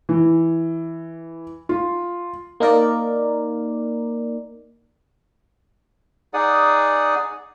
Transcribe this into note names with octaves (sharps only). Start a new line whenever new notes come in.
E3
F4
A#3 D#4 A#4 D5
D#4 G#4 D5 F#5 D#6